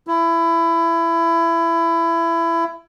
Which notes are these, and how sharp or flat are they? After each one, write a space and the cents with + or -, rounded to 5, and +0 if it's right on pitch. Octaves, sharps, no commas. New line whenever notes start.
E4 +20